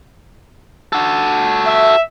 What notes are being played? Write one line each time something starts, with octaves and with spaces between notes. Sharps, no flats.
F#4 A4
E5